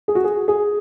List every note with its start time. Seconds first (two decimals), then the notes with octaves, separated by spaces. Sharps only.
0.08 G#4
0.15 F#4
0.24 G#4
0.48 G#4